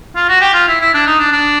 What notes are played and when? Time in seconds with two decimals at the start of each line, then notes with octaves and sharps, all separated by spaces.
0.16 F4
0.29 F#4
0.41 G4
0.54 F4
0.68 E4
0.81 E4
0.94 D4
1.07 D#4
1.19 D4
1.32 D4